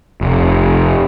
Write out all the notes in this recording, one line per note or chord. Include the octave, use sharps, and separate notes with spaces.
F1